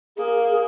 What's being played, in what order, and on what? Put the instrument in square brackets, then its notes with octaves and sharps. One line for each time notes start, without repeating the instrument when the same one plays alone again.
[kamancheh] A#3 [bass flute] G#4
[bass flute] G#4